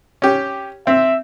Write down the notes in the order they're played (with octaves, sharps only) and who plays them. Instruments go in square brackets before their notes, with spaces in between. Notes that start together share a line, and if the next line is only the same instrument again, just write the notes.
[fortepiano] C#4 G4
[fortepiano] C4 [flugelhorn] E5